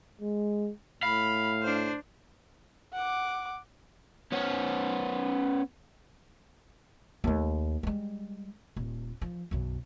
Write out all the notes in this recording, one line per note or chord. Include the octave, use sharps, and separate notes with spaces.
G#3
A2 F5 B5
D4 C5
F#5 D6
B3 C#4
D#2 A3
G3 G#3
D#1
F3
B1 F#2